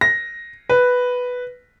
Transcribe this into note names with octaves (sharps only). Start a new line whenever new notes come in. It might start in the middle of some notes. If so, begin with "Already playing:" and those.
A#6
B4